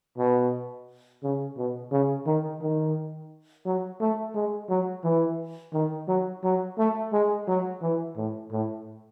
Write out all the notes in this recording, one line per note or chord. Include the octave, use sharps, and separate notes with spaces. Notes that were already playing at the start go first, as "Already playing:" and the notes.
B2
C#3
B2
C#3
D#3
D#3
F#3
A3
G#3
F#3
E3
D#3
F#3
F#3
A3
G#3
F#3
E3
A2
A2